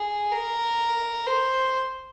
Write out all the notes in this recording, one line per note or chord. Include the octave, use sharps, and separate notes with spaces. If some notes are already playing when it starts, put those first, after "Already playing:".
Already playing: G#4
A#4
C5